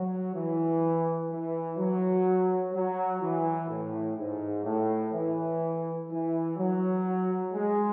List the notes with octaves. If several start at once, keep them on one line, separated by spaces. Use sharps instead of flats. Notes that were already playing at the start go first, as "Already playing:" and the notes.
Already playing: F#3
E3
E3
F#3
F#3
E3
A2
G#2
A2
E3
E3
F#3
G#3